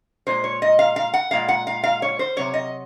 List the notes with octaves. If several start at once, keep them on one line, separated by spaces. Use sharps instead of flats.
A#2 G#3 C5
C#5
D#5
F5
F5
F#5
A#2 G#3 F5
F#5
F5
F5
C#5
C5
C3 F#3 C#5
D#5